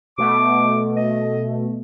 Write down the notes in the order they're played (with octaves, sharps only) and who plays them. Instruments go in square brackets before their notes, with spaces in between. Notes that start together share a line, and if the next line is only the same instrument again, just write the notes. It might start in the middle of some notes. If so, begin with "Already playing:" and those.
[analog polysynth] B2 A3 [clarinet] D6
[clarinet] D#5